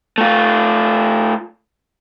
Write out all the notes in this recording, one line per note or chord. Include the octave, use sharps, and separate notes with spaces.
A3 F4